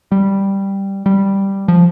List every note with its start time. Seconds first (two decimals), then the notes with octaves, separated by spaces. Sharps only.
0.12 G3
1.06 G3
1.68 F3